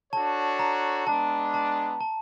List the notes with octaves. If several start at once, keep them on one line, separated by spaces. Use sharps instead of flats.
D4 F#4 A4 C#5 A5
A#5
G#3 B3 D4 A5
A5
A5